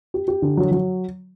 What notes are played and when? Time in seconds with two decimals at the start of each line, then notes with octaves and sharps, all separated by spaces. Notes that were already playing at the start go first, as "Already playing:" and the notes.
0.14 G4
0.28 G4
0.42 D3
0.57 F#3
0.71 F#3